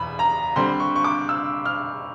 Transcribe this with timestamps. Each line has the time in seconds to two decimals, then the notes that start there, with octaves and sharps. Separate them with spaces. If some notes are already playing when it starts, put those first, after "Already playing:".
Already playing: E2 B2 B3 B5
0.19 A#5
0.56 D3 G3 C4 C6
0.80 C#6
0.96 C#6
1.04 D6
1.29 E6
1.66 F6